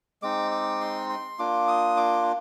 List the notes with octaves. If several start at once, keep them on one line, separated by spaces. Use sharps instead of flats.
G#3 C4 D#4 D6
D6
C6
C6
A#3 D4 F4 D6
D#6
D6